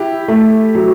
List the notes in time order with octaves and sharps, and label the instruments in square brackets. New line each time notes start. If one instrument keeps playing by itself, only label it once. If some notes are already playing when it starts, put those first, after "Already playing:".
Already playing: [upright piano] E4 G4
[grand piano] A3
F#3